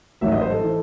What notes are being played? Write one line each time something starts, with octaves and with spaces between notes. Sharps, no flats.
A1 G#2 D#3 F#3 E5
D#5
C5
A4
E3